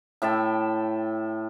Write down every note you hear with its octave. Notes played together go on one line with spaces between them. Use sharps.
A2 E5 G5 A5